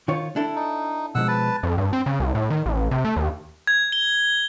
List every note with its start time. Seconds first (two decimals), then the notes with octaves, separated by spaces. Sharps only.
0.08 D#3 F4 C#5
0.36 D4 E4 A4
0.55 D#4
1.15 B2 F3 G#3 F#5 E6
1.28 B4 A5
1.63 F2
1.78 G2
1.93 C4
2.06 C#3
2.20 C2
2.35 A2
2.50 D#3
2.66 A1
2.91 C3
3.04 A3
3.16 D#2
3.67 G#6
3.92 G7